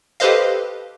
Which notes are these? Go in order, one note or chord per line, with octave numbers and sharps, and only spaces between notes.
G4 A4 B4 C5 D#5 F5